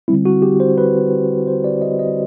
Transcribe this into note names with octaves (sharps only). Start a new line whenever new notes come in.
D3 G3 C4 E4
F#4
G4
C5
B4
C5
D5
D#5
D#5